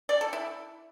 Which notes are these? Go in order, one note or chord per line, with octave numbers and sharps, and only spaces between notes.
D5
A4
E4